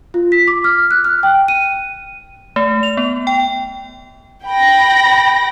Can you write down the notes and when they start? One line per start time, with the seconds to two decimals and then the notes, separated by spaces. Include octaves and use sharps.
0.14 F4
0.32 B6
0.48 D6
0.64 F6
0.91 F#6
1.05 F6
1.23 G5
1.48 D#7
2.56 A3
2.83 F7
2.97 B3
3.27 G5
4.46 G5 B5 A#6